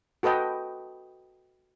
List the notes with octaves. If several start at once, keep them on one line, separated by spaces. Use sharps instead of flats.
F#4 A4 B4 D#5 G5